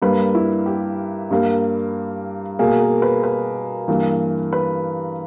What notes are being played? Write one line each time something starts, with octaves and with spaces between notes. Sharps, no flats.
G2 G3 A#3 B4
E4
G4
G2 G3 A#3
B2 A#3 G#4
A#4
B4
B4
G2 E3 A#3
B4